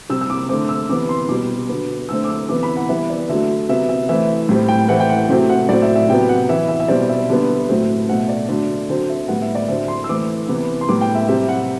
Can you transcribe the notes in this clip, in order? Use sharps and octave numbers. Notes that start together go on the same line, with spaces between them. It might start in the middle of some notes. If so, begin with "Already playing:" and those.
C3 G3 C4 E6
E6
D6
D3 A3 C4 D6
E6
C3 E3 B3 D6
C6
B2 G3 B3 D6
D3 F#3 B3
D3 A3 C4 E6
D6
E6
C3 E3 B3 D6
B5
F#5
E3 G3 B3 E5
D5
D3 F#3 A3 E5
C3 F#3 B3 E5
E5
E3 A3 C4 E5
A2 G3 C4
G5
E3 A3 C4 F#5
G5
F#5
C3 F#3 A3 C4
F#5
A2 F#3 C4 D5
E5
E5
C3 F#3 B3 G5
F#5
E3 B3 E5
E5
E5
B2 G3 C4 D5
E5
D3 G3 B3
A2 F#3 A3 C4
B2 A3 C4 F#5
D5
D3 F#3 A3 D5
D3 F#3 C4
E5
A2 G3 B3 F#5
E5
D5
D3 F#3 C4 E5
C6
E6
E3 A3 C4 D6
C3 E3 B3
C6
A2 G3 B3 D6
G5
E5
C3 G3 C4 E5
F#5